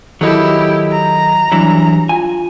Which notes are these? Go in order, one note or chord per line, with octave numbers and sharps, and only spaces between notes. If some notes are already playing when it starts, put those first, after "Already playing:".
D#3 F#3 E4 G4 A4 D#5
A#5
E3 F#3 G3 D4 E4
F4 G#5